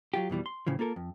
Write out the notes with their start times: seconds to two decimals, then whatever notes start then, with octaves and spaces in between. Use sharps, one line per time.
0.14 F#3 F4 G4
0.30 F2 B2 E3 G3
0.46 C6
0.67 A2 C#3 E3 F3
0.79 A#3 F4 A4 A#4
0.96 F2